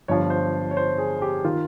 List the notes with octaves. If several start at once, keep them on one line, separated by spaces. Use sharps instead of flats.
G1 G2 F3 C#5
C5
C#5
C5
G#4
G4
D#3 F4